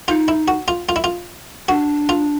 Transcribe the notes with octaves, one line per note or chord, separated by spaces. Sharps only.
D#4 F4
E4
F#4
F4
F4
E4
F4
D4 F#4
F4